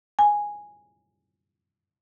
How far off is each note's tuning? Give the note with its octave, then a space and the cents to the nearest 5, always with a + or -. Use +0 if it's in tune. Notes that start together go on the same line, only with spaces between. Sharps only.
G#5 -5